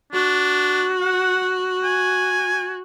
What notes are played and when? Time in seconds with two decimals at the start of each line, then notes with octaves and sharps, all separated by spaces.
0.13 D4 F#4
1.01 F#5
1.84 G#5